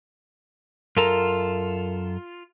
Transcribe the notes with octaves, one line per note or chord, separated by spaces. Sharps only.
F#2 F4 A4 A#4 A#5